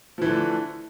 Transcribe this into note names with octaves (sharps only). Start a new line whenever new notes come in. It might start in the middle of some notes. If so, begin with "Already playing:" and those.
D3 E3 F3 A3